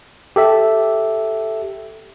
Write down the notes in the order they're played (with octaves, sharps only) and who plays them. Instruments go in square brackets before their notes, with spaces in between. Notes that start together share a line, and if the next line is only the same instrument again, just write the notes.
[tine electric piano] G4 A4 E5